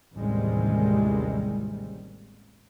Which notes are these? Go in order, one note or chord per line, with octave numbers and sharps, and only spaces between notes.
A1 D#2 C3 D#3 G3 G#3